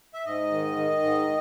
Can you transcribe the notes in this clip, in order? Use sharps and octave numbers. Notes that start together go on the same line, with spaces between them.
E5
G#2 D#5
D#3
D#3
G#2